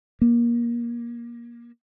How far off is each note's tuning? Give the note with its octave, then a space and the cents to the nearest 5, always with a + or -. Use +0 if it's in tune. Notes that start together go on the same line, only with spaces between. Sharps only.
A#3 +25